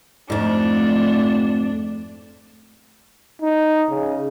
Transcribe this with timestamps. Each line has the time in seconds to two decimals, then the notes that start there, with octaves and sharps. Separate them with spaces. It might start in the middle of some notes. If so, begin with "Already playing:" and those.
0.30 F2 G#2 A3 D4
3.42 D#4
3.90 C#3